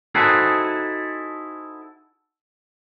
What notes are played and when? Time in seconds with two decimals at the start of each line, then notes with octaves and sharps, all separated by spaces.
0.15 D#4 E4 F#4 G#4 A4 C5